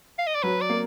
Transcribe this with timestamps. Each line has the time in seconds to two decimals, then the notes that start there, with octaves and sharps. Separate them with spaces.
0.18 F5
0.27 D#5
0.35 D5
0.43 F#3 B4
0.61 D5
0.70 A#3